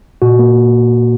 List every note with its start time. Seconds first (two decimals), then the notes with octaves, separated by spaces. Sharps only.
0.22 A#2 F#4
0.39 A#3